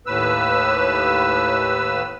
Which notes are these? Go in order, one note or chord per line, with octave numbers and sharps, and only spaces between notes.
D#2 A2 B4 E6